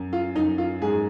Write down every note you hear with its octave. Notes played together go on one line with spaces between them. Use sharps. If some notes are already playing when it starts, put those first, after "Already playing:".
Already playing: F#2
F4
F#2 D#4
F4
G#2 G#4